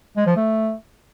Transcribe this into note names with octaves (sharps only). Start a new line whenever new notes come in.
G#3
F3
A3